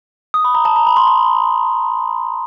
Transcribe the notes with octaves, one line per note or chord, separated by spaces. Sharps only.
D#6
B5
A#5
A5
A#5
B5
C6
C6